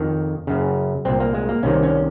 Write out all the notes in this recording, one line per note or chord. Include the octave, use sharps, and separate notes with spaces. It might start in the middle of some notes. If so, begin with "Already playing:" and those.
Already playing: F2 D#3
F#2 C#3
C2 A#2 C4
A#3
G#3
A#3
C2 C3 D#3 C#4
C#4